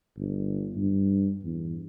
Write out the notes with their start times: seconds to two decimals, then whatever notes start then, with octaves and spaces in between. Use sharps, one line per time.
0.17 G1
0.76 G2
1.44 E2